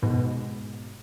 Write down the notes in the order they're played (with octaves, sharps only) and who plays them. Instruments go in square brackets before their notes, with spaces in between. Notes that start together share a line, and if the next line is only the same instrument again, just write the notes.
[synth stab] G#2 B2